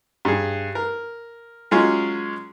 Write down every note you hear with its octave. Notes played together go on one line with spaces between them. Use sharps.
G2 G#4
A#4
F#3 G#3 C#4 F4 G#4